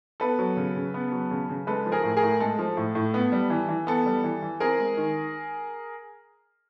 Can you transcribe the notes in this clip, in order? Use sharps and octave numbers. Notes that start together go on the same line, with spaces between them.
B3 A4 B4
F#3
C#3
C#3
B3
F#3
C#3
C#3
G#3 A4 B4
F3
G#4 A#4
A2
G#4 A#4
A2
G#3 A4
F3
A2
A2
B3
G3
E3
E3
B3 A4
G3
E3
E3
C4 G#4 A#4
G#3
D#3